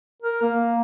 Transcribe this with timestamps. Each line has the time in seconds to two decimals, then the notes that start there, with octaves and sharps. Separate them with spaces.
0.22 A#4
0.42 A#3